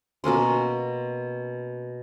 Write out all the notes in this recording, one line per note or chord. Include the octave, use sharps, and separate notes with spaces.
B2 A#3 C#4 C6